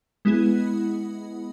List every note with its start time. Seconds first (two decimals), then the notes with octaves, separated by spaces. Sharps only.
0.25 G#3 B3 E4 G#4